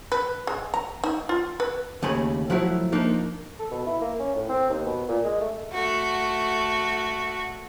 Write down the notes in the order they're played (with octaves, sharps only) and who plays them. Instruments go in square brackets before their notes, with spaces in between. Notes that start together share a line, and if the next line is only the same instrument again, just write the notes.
[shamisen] B4
G#3
A#5
D#4
F4
B4
[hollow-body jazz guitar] D#2 C#3 A3 G#5 B5
F3 F#3 A3 E4
F3 A#3 D4 D#4
[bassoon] A4
B2
E4
A#3
C#4
A2
C4
D#2
B2
A#2
G#3
A3
[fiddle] A3 F#4